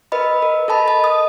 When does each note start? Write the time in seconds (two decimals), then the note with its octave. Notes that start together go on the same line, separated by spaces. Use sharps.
0.12 A#4 B4 D#5 B5
0.42 A#4
0.68 A4 D#5 A5 B5
0.87 D#5 A5
1.04 D#6